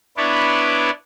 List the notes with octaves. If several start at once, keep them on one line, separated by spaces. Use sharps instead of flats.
B3 D4 E4 B4 C#5 D5